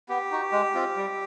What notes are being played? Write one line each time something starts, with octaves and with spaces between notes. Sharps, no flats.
B3 G4
D#4 F#4
G#3
C4 F4
G3